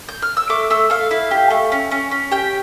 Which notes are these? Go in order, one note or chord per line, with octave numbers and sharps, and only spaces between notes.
G6
F6
E6
A3 D6
A3 E6
A3 F5
E4 F5
G4
A3
C#4
C#4
C#4
G4 G5